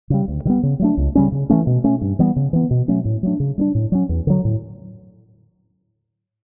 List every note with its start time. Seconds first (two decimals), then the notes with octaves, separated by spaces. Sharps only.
0.10 C#3 G3
0.28 D2
0.45 D3 G3 B3
0.63 C#3
0.80 F#3 A3 D4
0.97 C#2
1.15 C#3 G3 C#4
1.32 C#3
1.50 E3 A3 C#4
1.67 B2
1.84 A3 C#4
2.01 G2
2.19 E3 G3 B3
2.36 C#3
2.53 E3 B3
2.71 B2
2.88 F#3 A3 C#4
3.05 A2
3.23 F#3 A3 D4
3.40 C#3
3.58 G3 B3 D4
3.75 A2
3.92 F#3 C#4
4.09 E2
4.27 D3 F#3
4.45 A2